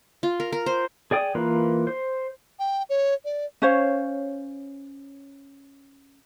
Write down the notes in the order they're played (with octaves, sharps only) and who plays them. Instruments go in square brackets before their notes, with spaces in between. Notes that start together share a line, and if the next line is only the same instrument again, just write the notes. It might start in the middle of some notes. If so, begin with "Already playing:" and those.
[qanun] F4
A#4
A#4
C5
[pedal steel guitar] G#4 D5 G5 D#6
E3 A#3 F4 B4
C5
[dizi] G5
C#5
D5
[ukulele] C#4 C5 C#5 F5